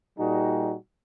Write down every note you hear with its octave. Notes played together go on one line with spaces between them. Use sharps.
A#2 G3 D#4 F#4 G#4